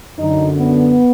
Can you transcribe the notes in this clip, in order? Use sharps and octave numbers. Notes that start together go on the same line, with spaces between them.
F#2 D3 D#4
B3